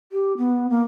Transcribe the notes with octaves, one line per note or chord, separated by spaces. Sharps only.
G4
B3
A#3